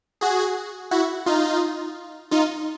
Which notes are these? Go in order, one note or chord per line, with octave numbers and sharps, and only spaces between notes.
F#4 G#4
E4 F#4
D#4 F4
D#4 F4